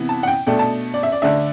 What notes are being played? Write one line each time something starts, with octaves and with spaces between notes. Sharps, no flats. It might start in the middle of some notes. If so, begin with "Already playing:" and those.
Already playing: C3 E3 B3
A5
F#5
G5
B2 A3 D4 G5
A5
D5
E5
D5
D3 A3 D4 E5